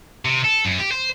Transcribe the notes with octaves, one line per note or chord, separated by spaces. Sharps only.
C3
A4
F#2
G4
C5